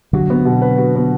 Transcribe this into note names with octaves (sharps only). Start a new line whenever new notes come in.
D3 F#3 F#4
B3
B2
B4
F#4
B3